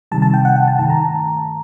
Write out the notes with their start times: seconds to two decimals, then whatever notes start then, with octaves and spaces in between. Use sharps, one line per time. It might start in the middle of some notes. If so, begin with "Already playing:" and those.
0.12 C3 D#3 G3 A5
0.22 A5
0.34 G5
0.45 F#5
0.56 F#5
0.68 A5
0.78 G2 D#3 A3 A5
0.90 A#5
1.01 A5